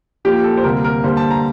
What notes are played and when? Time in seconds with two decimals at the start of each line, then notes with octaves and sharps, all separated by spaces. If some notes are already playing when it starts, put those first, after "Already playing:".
0.25 A#2 F3 A#3 G4
0.44 A4
0.57 C5
0.64 D2 C3 G3 A#3 A#4
0.84 A#4
1.04 G2 D3 G3 A#3 C5
1.17 A5
1.31 A#5